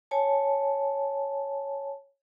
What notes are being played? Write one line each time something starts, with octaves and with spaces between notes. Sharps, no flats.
C#5 G#5 A5